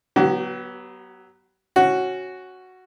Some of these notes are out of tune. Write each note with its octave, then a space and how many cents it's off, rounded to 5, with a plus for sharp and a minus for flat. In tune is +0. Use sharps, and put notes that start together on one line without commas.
F#3 +10 B3 -15 G4 -45
C#4 -20 F#4 +0